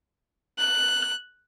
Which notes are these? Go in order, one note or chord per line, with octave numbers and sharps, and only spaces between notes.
F#6